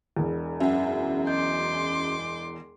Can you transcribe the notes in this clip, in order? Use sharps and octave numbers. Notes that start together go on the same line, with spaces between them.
E1 E2
F#2 E5 F#5
D#5 C6 D6 G6